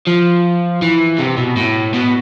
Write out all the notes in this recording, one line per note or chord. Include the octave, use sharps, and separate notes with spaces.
F3
E3
C3
B2
A2
B2